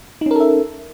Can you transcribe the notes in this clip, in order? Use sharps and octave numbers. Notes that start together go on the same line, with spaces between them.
C#4 D#4 A4 A#4 E5